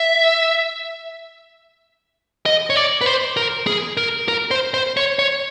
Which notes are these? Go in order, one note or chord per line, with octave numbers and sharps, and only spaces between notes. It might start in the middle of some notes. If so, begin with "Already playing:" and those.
Already playing: E5
D#5
C#5
D5
B4
C5
A#4
G#4
A#4
A#4
C5
C5
C#5
C#5